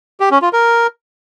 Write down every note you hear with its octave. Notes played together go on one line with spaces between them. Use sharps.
G4
C#4
F4
A#4